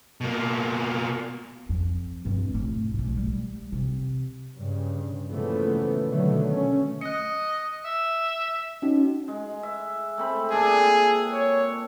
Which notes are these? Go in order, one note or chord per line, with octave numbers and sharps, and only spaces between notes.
B2 A#3
F2
G2 C4
F1 A2
B1 A2
G3
C3
G2 C#3
A#2 C#3 E3 F3 A3 B3
B2 D3 D#3 F#3 A3 B3
A3 C#4
D#5 F#6 C#7
E5
C#4 D#4 F#4
G#3
E5
A3 C4 B5
A#2 D4 G#4 A4
C#5